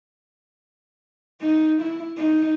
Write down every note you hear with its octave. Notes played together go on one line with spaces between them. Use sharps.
D#4
E4
D#4